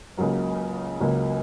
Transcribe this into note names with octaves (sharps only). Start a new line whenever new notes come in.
C#2 C#3 F#3 A#3
C#2 C#3 F#3 A#3